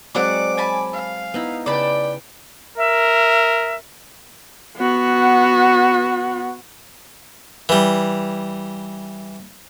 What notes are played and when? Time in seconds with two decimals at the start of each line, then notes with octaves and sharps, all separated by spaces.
0.15 F#3 G#3 C4 D5 F#5 D6
0.57 G#5 A5 B5
0.93 F5
1.34 B3 D#4 E4
1.66 C#3 B4 D5 G5 A5 B5
2.78 A#4 E5
4.77 B3 F#4
7.69 E3 G3